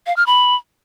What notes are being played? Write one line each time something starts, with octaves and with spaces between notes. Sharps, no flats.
F5
F6
B5